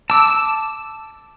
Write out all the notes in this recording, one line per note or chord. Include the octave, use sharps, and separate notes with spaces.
A5 D6 E6